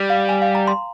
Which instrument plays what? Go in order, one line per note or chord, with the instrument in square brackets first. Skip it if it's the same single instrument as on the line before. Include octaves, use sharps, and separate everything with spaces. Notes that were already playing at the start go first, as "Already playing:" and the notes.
Already playing: [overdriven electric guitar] G3
[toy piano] F5
G#5
F5
A#5
C6